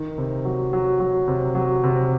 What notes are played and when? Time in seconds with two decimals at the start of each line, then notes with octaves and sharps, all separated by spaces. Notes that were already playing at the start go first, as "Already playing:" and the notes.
Already playing: D#3
0.18 C3
0.45 F#3
0.73 F#3
1.00 F#3
1.28 C3
1.55 F#3
1.83 C3